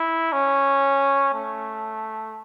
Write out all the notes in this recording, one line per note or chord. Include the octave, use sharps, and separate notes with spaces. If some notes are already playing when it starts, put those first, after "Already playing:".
Already playing: E4
C#4
A3